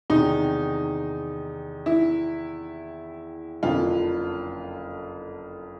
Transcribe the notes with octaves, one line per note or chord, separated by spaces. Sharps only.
E2 C3 D#3 D#4
E4
F#1 F2 D3 F4